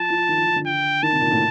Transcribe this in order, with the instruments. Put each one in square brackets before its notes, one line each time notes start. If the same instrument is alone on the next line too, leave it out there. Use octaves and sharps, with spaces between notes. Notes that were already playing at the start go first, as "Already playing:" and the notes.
Already playing: [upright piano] F3 [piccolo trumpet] A5
[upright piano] F3
D#3
F3
D#3
D3
[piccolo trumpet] G5
[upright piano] D#3 [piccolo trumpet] A5
[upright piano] C3
A#2
A2